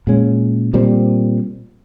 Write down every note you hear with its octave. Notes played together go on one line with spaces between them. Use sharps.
A#2 G#3 C#4
A#2 G3 C4